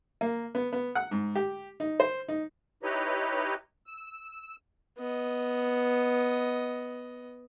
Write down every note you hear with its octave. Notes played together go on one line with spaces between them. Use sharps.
A#3
B3
B3
F#5
G#2
G4
D#4
C5
D#4
D#4 E4 G4 B4 C#5 D#5
E6
B3 D#5